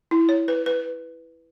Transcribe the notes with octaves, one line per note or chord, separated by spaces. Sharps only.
E4
C#5
B4
B4